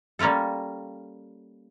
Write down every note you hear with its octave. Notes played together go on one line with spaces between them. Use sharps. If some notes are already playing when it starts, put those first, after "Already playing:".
G3 A#3 C#4 F4 A4